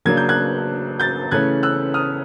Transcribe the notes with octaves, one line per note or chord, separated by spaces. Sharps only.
C#3 F#3 A#3 D4 G#6
G6
F#6 G#6
G6 A6
C#3 E3 A3 C#4 F#6 G#6
E6 F#6
D#6 F6